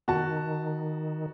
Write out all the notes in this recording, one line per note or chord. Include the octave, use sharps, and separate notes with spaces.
D#3 F#4 A5